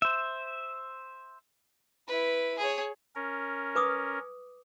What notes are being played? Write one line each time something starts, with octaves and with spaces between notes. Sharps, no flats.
C5 E5
E4 B4
G#4 C#5
C#4 A#4
B4 D6 D#6